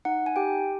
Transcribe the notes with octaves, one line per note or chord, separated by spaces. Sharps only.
D#4 F#5
G#5
G4 G5